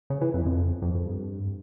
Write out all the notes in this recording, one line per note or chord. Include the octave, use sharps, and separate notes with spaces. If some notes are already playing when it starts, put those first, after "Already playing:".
C#3
E3
F2
F2
F2
F2
G2